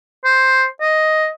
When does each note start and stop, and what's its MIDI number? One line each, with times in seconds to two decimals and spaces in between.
0.25 0.65 72
0.81 1.28 75